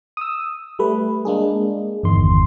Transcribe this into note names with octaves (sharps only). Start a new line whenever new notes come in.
D#6 E6
G3 A3 B4
G#3 A#3 D4 G#4
G1 E2 D#3 C6